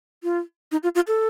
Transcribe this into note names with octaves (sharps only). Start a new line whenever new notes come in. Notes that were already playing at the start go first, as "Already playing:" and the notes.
F4
D#4
F4
F4
A4